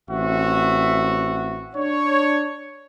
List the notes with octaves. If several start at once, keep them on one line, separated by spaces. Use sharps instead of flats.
A1 C4 F#4 E5
D4 C#5